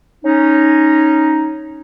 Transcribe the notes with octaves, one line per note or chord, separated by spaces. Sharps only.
C#4 D#4